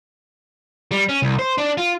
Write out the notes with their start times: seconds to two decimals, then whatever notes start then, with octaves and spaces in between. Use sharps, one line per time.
0.91 G3
1.09 C#4
1.22 C2
1.39 C5
1.58 D4
1.78 F4